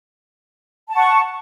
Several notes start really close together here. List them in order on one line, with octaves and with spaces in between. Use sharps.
A5 F#5 C#6